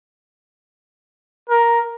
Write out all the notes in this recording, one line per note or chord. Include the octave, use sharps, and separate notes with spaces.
A#4